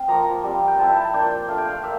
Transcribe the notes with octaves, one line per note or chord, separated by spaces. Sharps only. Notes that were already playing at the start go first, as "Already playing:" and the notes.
Already playing: C4 F5
F3 A#3 F4 A#5
G3 C4 F4
G5
F3 C4 E4 A5
A5
A#3 D4 F4 G5
A3 D4 F4 F5
G5
F5
A#3 E5